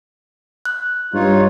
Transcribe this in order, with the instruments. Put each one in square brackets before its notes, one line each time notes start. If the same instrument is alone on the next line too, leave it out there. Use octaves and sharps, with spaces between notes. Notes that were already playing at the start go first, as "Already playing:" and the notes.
[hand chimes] F#6
[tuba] G2 [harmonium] D#4 F4 C#5